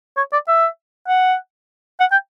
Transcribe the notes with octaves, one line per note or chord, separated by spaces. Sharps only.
C#5
D5
E5
F#5
F#5
G5